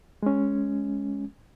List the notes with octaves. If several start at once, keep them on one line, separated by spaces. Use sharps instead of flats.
G#3 C#4